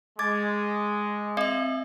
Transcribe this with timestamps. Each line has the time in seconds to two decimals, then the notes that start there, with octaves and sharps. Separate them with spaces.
0.19 G#3 D6 G#6 A6
1.37 C4 D#5 E5